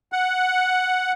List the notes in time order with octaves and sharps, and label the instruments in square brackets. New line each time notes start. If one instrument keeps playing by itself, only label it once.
[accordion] F#5